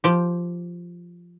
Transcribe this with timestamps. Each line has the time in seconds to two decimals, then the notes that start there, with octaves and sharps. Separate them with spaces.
0.04 F3 G4